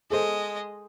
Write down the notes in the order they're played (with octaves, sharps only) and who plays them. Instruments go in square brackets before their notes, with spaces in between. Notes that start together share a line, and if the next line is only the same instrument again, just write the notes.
[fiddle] G#3 D#5 [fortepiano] G#4 A4 C5